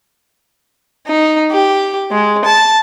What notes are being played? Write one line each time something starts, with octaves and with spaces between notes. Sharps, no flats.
D#4
G4
G#3
A5